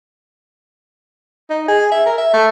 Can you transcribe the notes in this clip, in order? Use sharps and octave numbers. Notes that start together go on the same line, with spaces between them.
D#4
G#4
E5
A#4
E5
A3